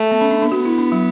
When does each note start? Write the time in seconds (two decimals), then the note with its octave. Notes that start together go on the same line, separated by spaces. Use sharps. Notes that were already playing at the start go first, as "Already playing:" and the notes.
Already playing: A3
0.12 B3
0.21 C#4
0.31 D4
0.42 D4
0.51 B3 F#4
0.65 E4
0.78 D4
0.92 F#3